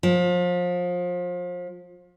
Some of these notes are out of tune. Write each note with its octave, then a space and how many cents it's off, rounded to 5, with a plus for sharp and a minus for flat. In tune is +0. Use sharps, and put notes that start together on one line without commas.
F3 +30